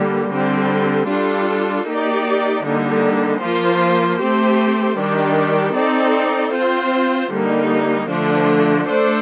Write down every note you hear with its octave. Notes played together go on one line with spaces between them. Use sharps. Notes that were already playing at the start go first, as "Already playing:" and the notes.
Already playing: D3 G3 A#3
D3 G3 C4
G3 D4 F4 A4
A#3 D#4 G4 D5
D3 G3 A#3 D#4
F3 A#3 F4 C5
A3 C4 G4 C5
D#3 G3 D4 G4
C4 D#4 A4 D5
C4 F4 C5
D3 G3 A#3 D#4
D3 F3 A3 D4
A3 D4 A4 C5